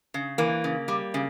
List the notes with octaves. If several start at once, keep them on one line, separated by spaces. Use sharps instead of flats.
C#3
E3 A#3
C#3
G3
C#3